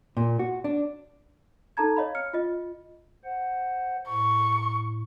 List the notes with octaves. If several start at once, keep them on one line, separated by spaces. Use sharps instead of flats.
A#2
F#4
D4
D#4 A4 A5 A#5 G#6
C#5 D#5 F5 B5
F6 C#7
F4 D#5
C5 F#5
A2 C#6